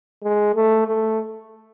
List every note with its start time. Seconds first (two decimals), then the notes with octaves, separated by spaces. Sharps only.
0.24 G#3
0.55 A3
0.87 A3